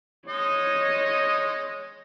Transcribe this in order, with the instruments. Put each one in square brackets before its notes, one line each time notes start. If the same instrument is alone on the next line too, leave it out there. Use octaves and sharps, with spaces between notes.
[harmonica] G#3 D#4 D#5 [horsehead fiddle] C#5